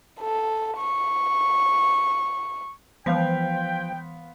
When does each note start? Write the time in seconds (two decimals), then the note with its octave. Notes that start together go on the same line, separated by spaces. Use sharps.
0.21 A4
0.78 C#6
3.06 E3 F3 B3 F5 G5 C6 B6